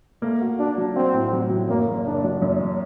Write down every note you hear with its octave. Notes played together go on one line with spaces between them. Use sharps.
A3 A#3
F#4
D4 F#4
F#3
C4 F#4
A2
F#3
F#3
F#2 A#3
F#1
F#1 D4
F#3
F#2